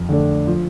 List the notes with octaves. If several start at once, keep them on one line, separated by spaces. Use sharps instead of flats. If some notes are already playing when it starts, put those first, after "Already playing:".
Already playing: F2
D3 A3 D4
F3